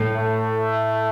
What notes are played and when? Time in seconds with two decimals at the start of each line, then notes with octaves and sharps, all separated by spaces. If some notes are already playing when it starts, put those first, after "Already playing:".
Already playing: A2
0.15 A3